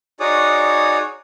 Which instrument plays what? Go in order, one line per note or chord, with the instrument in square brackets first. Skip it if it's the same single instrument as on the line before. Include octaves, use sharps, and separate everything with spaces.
[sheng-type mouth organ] D#4 F#4 G#4 C#5 D5 D#6